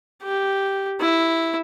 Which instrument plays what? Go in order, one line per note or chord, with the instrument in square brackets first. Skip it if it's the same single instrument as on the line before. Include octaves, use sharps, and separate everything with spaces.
[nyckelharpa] G4
E4